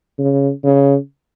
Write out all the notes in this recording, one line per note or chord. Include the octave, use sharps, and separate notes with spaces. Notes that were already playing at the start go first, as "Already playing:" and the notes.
C#3
C#3